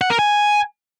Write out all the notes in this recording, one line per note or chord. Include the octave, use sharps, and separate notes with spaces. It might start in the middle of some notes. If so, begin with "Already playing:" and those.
F#5
A#4
G#5